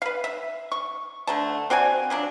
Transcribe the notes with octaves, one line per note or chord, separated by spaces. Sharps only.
B4 F5
E5
C#6
D3 A3 A5
C4 F#4 D5 G#5
F3 F#3 D4